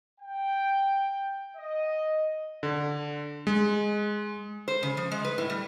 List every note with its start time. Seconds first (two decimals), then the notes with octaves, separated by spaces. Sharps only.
0.20 G5
1.56 D#5
2.63 D3
3.47 G#3
4.68 C5
4.83 C#3
4.97 F3
5.12 G#3
5.25 B4
5.38 A2
5.50 G3